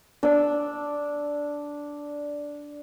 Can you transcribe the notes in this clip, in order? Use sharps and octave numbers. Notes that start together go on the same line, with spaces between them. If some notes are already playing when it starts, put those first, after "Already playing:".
D4 E6